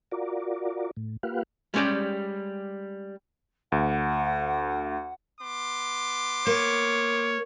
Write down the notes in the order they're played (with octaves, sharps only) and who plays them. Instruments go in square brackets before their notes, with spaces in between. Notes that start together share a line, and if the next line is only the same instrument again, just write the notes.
[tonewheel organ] F4 F#4 A#4 D5
A2
A#3 F4 G4 B4 F5 F#5
[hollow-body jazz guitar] G3 G#3 C#4 G4 D5
[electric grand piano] D2 [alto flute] F#5
[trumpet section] B3 C6 D6
[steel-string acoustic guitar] A#3 [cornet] C#5